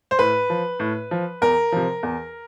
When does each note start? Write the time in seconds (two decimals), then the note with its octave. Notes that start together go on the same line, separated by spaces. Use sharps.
0.11 C5
0.19 A2 B4
0.50 F3
0.80 A2
1.11 F3
1.42 E2 A#4
1.72 C3 F3
2.03 E2